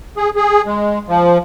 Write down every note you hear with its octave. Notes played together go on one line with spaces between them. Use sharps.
G#4
G#4
G#3
F3